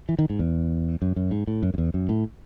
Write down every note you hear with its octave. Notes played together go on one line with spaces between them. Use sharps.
E3
D#3
G#2
E2
F#2
F#2
G#2
A2
F#2
F#2
E2
F#2
A2